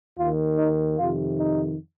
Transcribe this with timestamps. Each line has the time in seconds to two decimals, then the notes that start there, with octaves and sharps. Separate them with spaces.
0.18 D#2 D#3 F4
0.58 D#4
0.98 F2 C3 D#3 F4
1.39 D#4